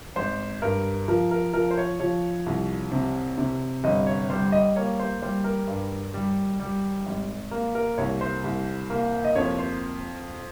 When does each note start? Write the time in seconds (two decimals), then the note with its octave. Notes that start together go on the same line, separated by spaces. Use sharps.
0.16 G#1 C5
0.62 G2 A#4
1.08 F3 A#4
1.31 A#4
1.53 F3 A#4
1.71 C5
1.78 C#5
2.00 F3 C#5
2.46 C2
2.92 C3
3.38 C3
3.84 G1 D#5
4.07 C#5
4.30 G3 C5
4.52 D#5
4.76 A#3 C#5
5.00 C5
5.22 G3 C5
5.44 A#4
5.67 G2
6.14 G3
6.60 G3
7.06 G#1
7.51 A#3
7.75 A#4
7.98 C2 C#5
8.21 C5
8.44 C2
8.90 A#3
9.25 D#5
9.36 F2 C#5
9.59 C5